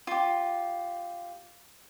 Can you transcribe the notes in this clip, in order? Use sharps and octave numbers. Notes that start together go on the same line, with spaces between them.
F4 G4